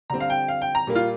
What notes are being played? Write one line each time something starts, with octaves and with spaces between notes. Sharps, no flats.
D3 G3 C4 A#5
F5
G5
F5
G5
A#5
A#2 G3 A#3
F4